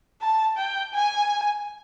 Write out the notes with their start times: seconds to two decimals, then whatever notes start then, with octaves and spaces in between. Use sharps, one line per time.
0.22 A5
0.57 G5
0.94 G#5